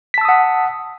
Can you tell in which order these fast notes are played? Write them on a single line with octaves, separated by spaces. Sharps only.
B6 A5 E6 D#6 F#5